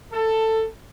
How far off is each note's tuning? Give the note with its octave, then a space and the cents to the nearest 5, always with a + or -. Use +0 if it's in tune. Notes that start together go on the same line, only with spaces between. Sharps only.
A4 +15